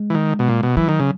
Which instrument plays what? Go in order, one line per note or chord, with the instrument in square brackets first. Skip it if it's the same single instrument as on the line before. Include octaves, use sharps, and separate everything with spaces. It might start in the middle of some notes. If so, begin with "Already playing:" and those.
Already playing: [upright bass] G#3
[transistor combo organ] E3
D#3
B2
A#2
B2
[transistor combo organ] E3 [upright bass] F#3
[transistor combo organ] D#3
C#3